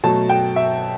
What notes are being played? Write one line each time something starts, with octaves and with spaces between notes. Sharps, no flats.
B2 F#3 A3 A5
G5
E5